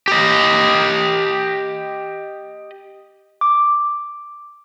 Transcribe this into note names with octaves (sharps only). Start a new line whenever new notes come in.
G4 D#5
D6